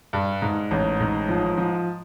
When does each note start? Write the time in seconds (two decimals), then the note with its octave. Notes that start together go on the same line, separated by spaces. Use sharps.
0.13 G2
0.42 G#2
0.71 A1
1.00 G#2
1.29 F3
1.58 F3